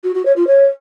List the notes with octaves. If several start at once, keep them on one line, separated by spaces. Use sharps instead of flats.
F#4
F#4
C#5
F4
C#5